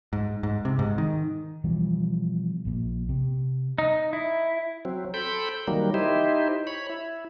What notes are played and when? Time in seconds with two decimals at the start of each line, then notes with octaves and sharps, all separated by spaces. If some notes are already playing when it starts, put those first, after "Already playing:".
0.13 G#2
0.43 G#2
0.65 C3
0.79 G#2
0.98 D#3
1.64 B2 E3 F3 G3
2.65 A#1 A#2
3.09 C3
3.78 D#4
4.13 E4
4.85 F#3 C4
5.14 A4 C5 G5 B5 G6
5.67 D#3 F#3 G3 A#3
5.94 D#4 E4 G4 C5
6.67 C#5 B5
6.89 E4